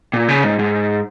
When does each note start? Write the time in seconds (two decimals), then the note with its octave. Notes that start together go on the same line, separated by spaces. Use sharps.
0.14 A#2
0.28 C#3
0.44 G#2
0.59 G#2